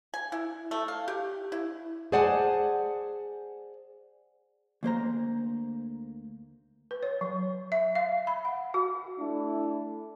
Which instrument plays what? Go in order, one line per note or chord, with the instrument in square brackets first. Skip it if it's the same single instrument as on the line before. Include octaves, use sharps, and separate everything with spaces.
[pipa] G#5
E4
A3
F5
G4
E4
[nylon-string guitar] G#4 C5 D5 F#5 G#5 A5
[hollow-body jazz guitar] D2 A#3 C5 A#5
[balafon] B4
C#5
F#3
E5
F5
B5
F#5
F#4
[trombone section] A3 D4 E4